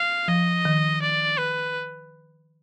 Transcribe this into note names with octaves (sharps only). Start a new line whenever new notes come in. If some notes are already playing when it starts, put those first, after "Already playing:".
Already playing: F5
F3 D#5
D#3
D5
B4